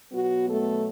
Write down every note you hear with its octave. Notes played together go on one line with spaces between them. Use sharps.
B2 F#3 B3 F#4
A3 A4